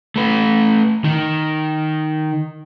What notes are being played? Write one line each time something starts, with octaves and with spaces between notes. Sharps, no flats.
A3 B4
D#3